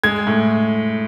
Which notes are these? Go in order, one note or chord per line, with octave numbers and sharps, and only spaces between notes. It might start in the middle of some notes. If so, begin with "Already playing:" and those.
G#3 G#6
A2